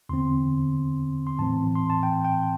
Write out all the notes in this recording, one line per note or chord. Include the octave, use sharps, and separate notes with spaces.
E2 D3 C4 C6
C6
A2 E3 C4 A5
C6
A5
G5
G5